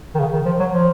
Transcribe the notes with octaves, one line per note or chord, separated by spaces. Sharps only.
D#3
C#3
D#3
F3
F#3
F3